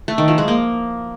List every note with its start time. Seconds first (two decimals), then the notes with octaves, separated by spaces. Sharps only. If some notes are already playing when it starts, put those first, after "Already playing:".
0.08 A3
0.18 D#3
0.28 F3
0.38 G#3
0.48 A#3